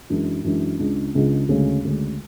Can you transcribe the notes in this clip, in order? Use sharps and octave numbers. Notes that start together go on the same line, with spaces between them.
F#2 E3 G#3 D4
F#2 E3 G#3 D4
C#2 C#3 G#3 D4
C#2 C#3 G#3 D4
D2 C#3 G#3 C#4
D2 C#3 G#3 C#4